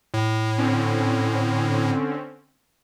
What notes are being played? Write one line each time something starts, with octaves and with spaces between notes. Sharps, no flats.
A2
D3 C4 C#4